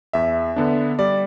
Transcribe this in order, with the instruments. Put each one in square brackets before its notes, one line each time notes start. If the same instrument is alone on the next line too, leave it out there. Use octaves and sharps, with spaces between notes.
[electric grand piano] E2 [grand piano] E5
[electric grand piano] D3 B3 D4
[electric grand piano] G3 [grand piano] D5